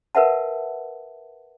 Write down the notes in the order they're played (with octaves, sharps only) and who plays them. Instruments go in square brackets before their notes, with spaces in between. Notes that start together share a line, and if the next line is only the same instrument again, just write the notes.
[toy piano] A#4 B4 E5 F#5 A5